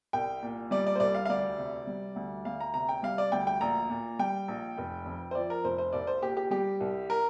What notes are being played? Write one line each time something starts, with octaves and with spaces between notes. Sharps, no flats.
C2 G5
A#2
G3 D5
D5
C5
C2 D5
F5
F5
D2 D5
C3
G3
D2
D2 F5
A#5
C3 A#5
G5
G3 F5
D5
D2 G5
G5
A#1 A#5
A#2
G3 G5
A#1
F1
F2
C5
F3 D5
A#4
F1 C5
C5
C2 D5
C5
A#2 G4
G4
G3 G4
C2
A#4